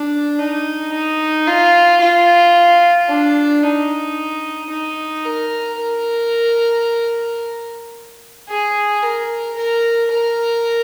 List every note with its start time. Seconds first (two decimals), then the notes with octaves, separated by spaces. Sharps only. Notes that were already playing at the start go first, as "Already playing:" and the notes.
Already playing: D4
0.39 D#4
0.93 D#4
1.47 F4
2.01 F4
3.09 D4
3.63 D#4
4.70 D#4
5.25 A#4
5.79 A#4
8.49 G#4
9.03 A#4
9.57 A#4
10.12 A#4